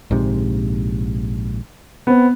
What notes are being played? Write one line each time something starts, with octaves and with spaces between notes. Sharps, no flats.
A#1 G#2 C3
B3 C4